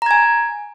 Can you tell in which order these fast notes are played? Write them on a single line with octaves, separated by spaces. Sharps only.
A#5 G#6 G#5